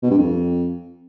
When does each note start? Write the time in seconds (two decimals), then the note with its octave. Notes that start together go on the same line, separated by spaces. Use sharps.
0.03 B2
0.11 G2
0.18 F2